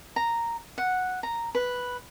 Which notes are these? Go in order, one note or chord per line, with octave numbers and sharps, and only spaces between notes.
A#5
F#5
A#5
B4